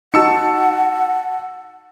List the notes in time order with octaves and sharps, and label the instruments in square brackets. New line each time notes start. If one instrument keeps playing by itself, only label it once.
[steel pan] D#4 F#4 [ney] F#5 [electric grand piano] A5 E6 C#7